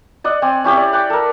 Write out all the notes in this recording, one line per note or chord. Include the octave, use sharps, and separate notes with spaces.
D5 D#5 F#5
C4 D5 G#5
C#4 E4 G4 C#5
D5
F#5 G5 D6
A4 A#4